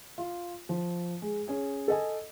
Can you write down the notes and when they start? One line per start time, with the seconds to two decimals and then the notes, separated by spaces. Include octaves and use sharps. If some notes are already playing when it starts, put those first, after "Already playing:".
0.18 F4
0.69 F3
1.22 G#3
1.48 C#4 G#4
1.88 A4 D#5 G#5